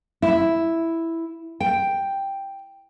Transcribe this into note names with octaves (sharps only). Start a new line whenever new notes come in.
E4
G5